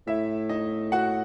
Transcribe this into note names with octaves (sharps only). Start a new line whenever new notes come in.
A2 E4 E5
D#4 D#5
F#4 F#5